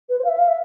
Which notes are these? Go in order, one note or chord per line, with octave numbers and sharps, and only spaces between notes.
B4
C5
F5
E5
F5
E5